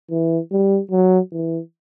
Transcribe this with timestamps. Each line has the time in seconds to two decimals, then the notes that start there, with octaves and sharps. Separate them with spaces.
0.11 E3
0.52 G3
0.91 F#3
1.32 E3